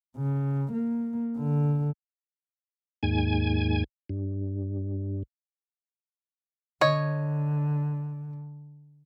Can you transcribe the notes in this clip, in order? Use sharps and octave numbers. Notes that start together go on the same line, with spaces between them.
C#3
A#3
D3
D#2 G#2 G#5
G2
D3 C#5 D#5